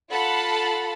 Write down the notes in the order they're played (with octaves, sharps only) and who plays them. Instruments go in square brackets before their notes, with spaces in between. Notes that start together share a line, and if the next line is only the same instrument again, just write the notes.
[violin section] F4 A4 F#5 A5 B5